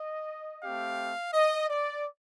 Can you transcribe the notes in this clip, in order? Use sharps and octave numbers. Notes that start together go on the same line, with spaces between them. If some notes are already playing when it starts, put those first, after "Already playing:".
Already playing: D#5
A3 C4 G4 F5
D#5
D5